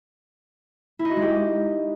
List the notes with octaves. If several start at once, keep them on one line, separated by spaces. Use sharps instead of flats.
E4
D#4
F#4
G#3
G4